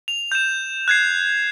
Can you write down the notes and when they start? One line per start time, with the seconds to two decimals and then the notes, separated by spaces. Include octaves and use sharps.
0.08 F7
0.32 G6 E7
0.88 F#6 G#6 C7